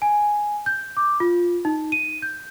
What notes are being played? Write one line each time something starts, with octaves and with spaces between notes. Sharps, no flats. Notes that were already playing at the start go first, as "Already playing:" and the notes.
G#5
G6
D6
F4
D#4
D#7
G6